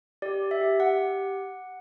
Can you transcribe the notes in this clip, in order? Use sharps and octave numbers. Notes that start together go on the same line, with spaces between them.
G4 D5
G4
E5
G4
G4 F#5
G4